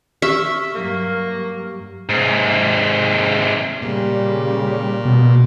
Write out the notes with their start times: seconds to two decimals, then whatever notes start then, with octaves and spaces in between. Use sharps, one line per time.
0.22 G4 E5 C#6 F6
0.75 G2 F#3 A#3
2.09 G#2 C3
3.82 A#2 C#3 G3
5.05 B2